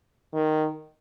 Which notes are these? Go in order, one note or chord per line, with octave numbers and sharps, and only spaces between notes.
D#3